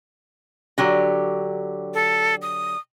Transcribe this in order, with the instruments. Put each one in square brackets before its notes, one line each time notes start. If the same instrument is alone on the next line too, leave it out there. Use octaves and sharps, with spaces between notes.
[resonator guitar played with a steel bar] D3 F#3 G4
[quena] A4
D#6